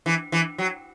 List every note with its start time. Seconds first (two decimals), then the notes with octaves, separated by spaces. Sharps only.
0.06 E3
0.32 E3
0.58 F#3